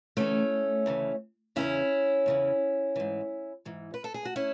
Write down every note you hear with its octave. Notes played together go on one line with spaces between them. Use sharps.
D2 C#3 E3 A3 C#4
D2 C#3 E3
E2 C#3 E3 C#4 E4
E2 C#3 E3
G#2 E3
G#2 E3
B4
A4
G#4
F#4
C#4 E4